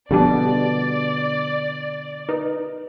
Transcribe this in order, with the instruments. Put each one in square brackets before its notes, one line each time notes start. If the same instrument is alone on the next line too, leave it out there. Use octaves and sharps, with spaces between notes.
[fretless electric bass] B2 D3 [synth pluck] F3 G3 D4 [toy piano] G4 A5 [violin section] D5
[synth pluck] D#4 [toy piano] B4